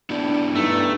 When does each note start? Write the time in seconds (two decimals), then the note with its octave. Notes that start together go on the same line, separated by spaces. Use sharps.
0.10 B3 D4 E4 G4
0.55 G2 A3 D#4